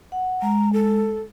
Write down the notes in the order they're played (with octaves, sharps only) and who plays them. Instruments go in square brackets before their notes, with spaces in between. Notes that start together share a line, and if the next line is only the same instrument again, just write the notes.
[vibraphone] F#5
[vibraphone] G#3 [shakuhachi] A#5
[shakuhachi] A4